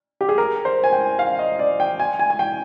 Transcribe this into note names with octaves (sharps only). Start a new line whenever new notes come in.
G4
G#4
A#4
C5
G#5
G5
F5
D#5
D5
G5
G#5
G#5
G#5
G5